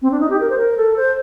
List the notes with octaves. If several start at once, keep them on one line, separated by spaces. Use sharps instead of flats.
C4
D4
D#4
G4
A#4
C5
A#4
A4
C5